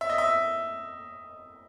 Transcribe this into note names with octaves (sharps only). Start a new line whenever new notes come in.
E5
D#5
E5